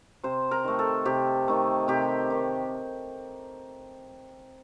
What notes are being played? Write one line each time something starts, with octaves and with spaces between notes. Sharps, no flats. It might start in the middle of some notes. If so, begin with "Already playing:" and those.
C3 C5
A#4
D#3 A3
A4
C3 G4
D#3 A3
C3 G4
D#3